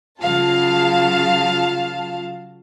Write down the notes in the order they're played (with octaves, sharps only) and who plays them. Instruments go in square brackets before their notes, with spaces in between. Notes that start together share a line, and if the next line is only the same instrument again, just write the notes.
[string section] C#3 F#3 F4 F5 A5